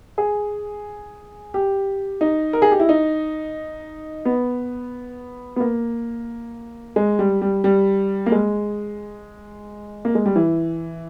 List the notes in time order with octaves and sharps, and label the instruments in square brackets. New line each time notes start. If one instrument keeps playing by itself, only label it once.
[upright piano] G#4
G4
D#4
A#4
G#4
G4
E4
D#4
B3
B3
A#3
G#3
G3
G3
G3
A#3
G#3
A#3
G#3
G3
E3